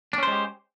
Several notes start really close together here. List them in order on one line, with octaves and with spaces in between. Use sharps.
D4 C#4 C5 G#3 G4